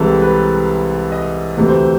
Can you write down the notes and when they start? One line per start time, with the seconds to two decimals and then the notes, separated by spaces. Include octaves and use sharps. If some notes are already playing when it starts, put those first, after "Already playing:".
Already playing: C2 C3 E3 G#3 A4
0.22 B4
1.12 D#5
1.57 D2 C3 E3 A3
1.68 C5